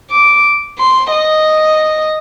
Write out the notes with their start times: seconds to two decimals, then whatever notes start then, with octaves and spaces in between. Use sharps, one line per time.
0.11 D6
0.78 C6
1.11 D#5